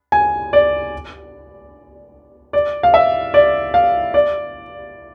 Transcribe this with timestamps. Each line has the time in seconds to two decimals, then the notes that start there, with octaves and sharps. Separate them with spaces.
0.12 G#5
0.53 D5
2.53 D5
2.83 F5
2.94 E5
3.34 D5
3.74 F5
4.14 D5